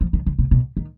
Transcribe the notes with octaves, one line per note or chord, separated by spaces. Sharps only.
F3
D#3
D3
B2
B2
D#3